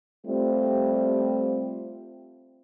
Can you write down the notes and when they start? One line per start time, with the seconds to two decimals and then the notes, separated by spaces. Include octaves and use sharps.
0.27 G3 A3 C4 F4 G4